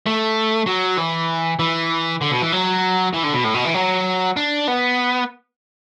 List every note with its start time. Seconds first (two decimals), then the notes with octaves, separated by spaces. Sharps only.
0.06 A3
0.67 F#3
0.98 E3
1.59 E3
2.21 D3
2.31 B2
2.42 E3
2.52 F#3
3.14 E3
3.24 D3
3.34 B2
3.44 A2
3.55 B2
3.65 E3
3.75 F#3
4.36 D4
4.68 B3